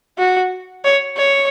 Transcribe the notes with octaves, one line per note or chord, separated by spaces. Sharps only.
F#4
C#5
C#5